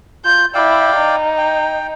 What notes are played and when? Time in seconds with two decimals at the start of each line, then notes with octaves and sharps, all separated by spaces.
0.25 F4 G6
0.55 E4 D5 F5 G5
0.96 D#4
1.38 G5